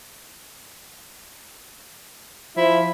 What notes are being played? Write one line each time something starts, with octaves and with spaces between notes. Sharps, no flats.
F3 E4